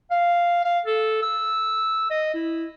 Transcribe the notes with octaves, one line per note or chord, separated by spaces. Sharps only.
F5
F5
A4
E6
D#5
E4